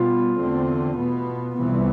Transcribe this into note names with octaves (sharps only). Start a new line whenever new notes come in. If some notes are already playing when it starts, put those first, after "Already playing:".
Already playing: B2 G3 B3 F4
E2 D3 A3 C4
B2 B3
C2 C3 E3 B3